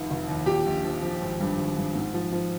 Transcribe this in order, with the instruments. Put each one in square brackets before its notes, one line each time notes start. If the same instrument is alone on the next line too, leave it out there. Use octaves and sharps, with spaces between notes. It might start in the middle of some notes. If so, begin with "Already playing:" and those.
Already playing: [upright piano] F1 C2 D#3
F1
D#2
A#2 G4
A#1
F3
F3
G#1
G2
G#1
G2
G#2
F3
F3